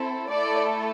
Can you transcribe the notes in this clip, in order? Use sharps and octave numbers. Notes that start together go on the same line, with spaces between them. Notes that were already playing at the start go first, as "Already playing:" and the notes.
Already playing: C4 E4 A4
A3 E4 A4 D5